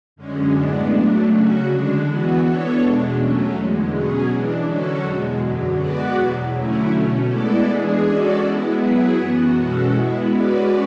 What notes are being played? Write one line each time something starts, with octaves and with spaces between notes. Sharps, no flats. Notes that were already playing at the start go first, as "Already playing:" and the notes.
F#2 D3 G#3 C#4
A2 G#3 B3 D4
F#3 A3 D4
C#3 F#3 C#4 F#4
D3 G#3 D4
E3 B3 F#4
E3 B3 D4 A4 C#5
E2 B2 G#3 D4
F#3 A3 C#4
E2 D3 G#3
B2 F#3 C#4 G#4
E3 G#3 D4
D3 F#3 C#4 F#4 A4
E2 B2 G#3
F#2 D3 F#3
G#3 B3 F#4 B4 D5
E2 B2 F#3
D3 F#3 A3 C#4 E4
B2 A3 C#4
G#3 B3 E4 A4 D5
E3 G#3 D4 G#4
G#3 C#4 F#4 A4 D5
G#3 B3 E4
F#3 B3 E4 G#4 B4
F#2 E3 B3 F#4
B2 G#3 C#4 F#4 A4
G#3 B3 E4
G#3 C#4 F#4 B4 D5